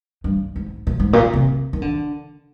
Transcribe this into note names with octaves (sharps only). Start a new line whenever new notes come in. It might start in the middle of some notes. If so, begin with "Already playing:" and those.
G2
G#2
A#2
G#2
A#2
C3
D#3
D3